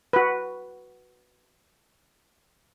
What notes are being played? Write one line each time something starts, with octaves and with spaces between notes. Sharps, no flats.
F#4 B4